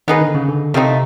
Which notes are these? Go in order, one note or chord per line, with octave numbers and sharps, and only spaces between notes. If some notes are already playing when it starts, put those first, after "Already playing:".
D#3 B3 D#4 G#4 B4
D3
C#3
D3
C3 F3 A3 C4 D#4